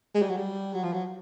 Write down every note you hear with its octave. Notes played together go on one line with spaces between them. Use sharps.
G#3
G3
F#3
G3
F#3
F3
F#3